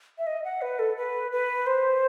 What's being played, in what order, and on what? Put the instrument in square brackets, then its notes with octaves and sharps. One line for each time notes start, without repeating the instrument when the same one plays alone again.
[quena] E5
D#5
F#5
B4
A4
B4
B4
C5